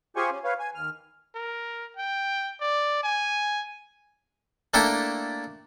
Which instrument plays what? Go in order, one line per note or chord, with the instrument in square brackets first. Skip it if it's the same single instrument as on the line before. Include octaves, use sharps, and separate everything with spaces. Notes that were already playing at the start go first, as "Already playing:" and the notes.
[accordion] F4 G4 G#4 C5 G#5 C#6
C#4
B4 C#5 F5
G#5
D#2 F6
[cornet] A#4
G5
D5
G#5
[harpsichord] A3 A#3 D4 E4 A4 G5